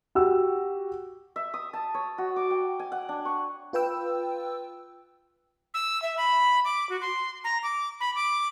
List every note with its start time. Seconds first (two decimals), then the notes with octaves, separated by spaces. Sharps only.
0.15 F#4 G4 E6
1.36 E5
1.54 D#6
1.73 A5
1.94 C#5
2.18 F#4
2.36 D6
2.51 G5
2.80 G#5
2.92 F#5
3.09 D4
3.25 C#6
3.73 F4 B4 G5 E6
5.74 E6
6.02 E5
6.18 B5
6.65 D6
6.89 F#4
7.02 C6
7.44 A#5
7.63 D6
8.00 B5
8.16 D6